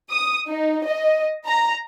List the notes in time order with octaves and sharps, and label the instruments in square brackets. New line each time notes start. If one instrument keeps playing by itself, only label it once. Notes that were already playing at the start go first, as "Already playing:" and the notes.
[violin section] D#6
D#4
D#5
A#5